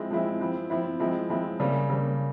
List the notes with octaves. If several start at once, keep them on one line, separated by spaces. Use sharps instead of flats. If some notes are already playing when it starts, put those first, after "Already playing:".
Already playing: F3 G#3 C4 E4
F3 G#3 C4 E4
F3 C4 E4
F3 C4 E4
F3 G#3 C4 E4
F3 G#3 C4 E4
C#3 G3 A#3
C#3 G3 A#3